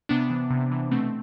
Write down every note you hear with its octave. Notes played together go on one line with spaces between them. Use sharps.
C3 B3 D4
E3
C3
E3
B2 A3 C4